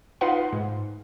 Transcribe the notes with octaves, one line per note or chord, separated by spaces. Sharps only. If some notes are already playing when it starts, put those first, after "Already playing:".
D#4 F4 B4 F5 F#5 C6
G#2